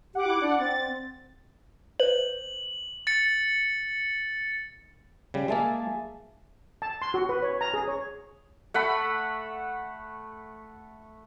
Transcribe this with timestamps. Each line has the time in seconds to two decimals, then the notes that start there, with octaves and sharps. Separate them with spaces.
0.15 G4 F#5 D6
0.27 E4
0.42 D4 D5 F#5
0.60 C4 A6
2.00 B4 C5 F#7
3.07 A6 C#7
5.34 C#3 G3
5.48 G#3 A#3 G#4 E5 A5
6.82 A5
7.02 C6
7.14 F#4
7.29 B4
7.43 C#5
7.61 A#5
7.74 G#4
7.88 C#5
8.74 A3 F#5 B5